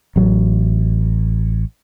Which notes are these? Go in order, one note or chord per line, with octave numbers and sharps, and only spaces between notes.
A1 F#3